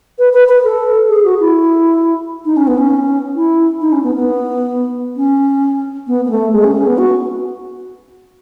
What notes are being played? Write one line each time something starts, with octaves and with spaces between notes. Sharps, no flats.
B4
B4
B4
A4
G#4
F#4
E4
D#4
C#4
B3
C#4
E4
D#4
C#4
B3
B3
C#4
B3
B3
A3
G#3
C#4
C#4
B3
F#4